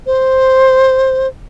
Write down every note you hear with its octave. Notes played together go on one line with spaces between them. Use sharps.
C5